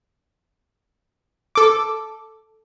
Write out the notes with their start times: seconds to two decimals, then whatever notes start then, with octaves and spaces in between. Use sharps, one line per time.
1.55 A4 D6